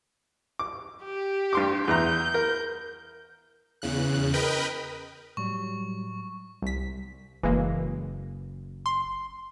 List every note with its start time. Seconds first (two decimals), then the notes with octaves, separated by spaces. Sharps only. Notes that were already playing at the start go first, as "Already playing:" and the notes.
0.59 D6
1.04 G4
1.53 G2 C6 D6
1.88 E2 A#5 G6
2.34 A#4
3.82 E2 C#3 F#6
4.34 A#4 B4 D#5 G5 B5
5.37 A2 F#3 G3 C#6
6.62 C2 B6
7.43 F#1 E3 G#3 A#3
8.86 C6